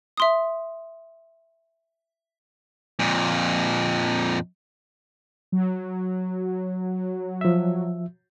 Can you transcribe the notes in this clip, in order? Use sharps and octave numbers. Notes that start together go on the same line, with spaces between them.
E5 C6 D#6
F2 A#2
F#3
F3 E5